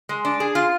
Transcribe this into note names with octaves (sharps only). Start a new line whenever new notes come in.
G#3
D4
G#4
F4